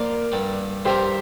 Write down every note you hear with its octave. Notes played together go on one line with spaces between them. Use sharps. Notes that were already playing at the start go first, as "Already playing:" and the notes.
Already playing: F3 A#3 F4 A#4 C5 D5
G2 D3 G3
G2 F3 C4 G4 A#4 C5